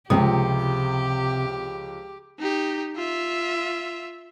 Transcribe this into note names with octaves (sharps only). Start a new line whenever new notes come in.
C#2 C3 F3 G4 D#6
D#4 G4
F4 E5